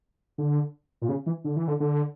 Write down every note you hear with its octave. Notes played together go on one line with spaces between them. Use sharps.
D3
A#2
C#3
E3
D3
E3
D3
D3